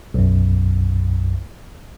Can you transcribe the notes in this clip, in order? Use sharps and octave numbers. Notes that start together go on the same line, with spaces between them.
B1 F#2